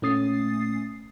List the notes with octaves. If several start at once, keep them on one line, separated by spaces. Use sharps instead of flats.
A#2 A3 C#4 D#6 A6 C7